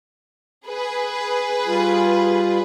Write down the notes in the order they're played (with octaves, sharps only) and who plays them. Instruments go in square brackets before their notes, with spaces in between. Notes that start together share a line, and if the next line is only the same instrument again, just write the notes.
[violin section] G#4 B4
[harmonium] G3 F4